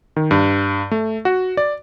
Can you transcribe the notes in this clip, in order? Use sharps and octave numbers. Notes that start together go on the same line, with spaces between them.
D#3
G2
A3
F#4
D5